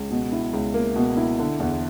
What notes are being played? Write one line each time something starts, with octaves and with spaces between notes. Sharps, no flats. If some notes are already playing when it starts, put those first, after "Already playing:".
Already playing: C#2
B2
E4
C#2
A#3
B2
E4
D3
E2